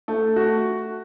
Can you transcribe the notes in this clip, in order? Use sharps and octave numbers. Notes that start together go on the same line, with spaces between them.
A3
F#4